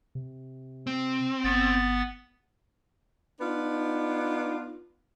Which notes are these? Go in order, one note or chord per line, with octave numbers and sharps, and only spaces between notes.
C3
C4
G1 B3 A6
B3 D4 D#4 F4